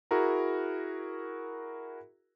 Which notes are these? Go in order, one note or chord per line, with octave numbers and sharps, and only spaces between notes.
E4 F#4 G#4 A#4 A#5